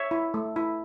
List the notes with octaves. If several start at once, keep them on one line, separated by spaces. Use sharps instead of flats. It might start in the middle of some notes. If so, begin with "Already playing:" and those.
Already playing: C#5 E5
E4
A3
E4